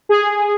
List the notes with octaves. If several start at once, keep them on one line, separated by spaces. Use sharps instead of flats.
G#4